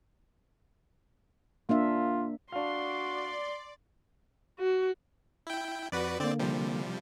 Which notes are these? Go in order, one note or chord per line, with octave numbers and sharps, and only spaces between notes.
A#3 D4 F4 E5
D4 F#4 D5 F5 C6
F#4
E4 G5
F2 F#4 B4 D5
D3 A#3 C4 D5
C3 F3 G3